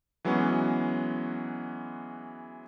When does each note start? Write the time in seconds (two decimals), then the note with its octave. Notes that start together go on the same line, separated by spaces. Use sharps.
0.25 E3 F#3 G#3 B3 C#4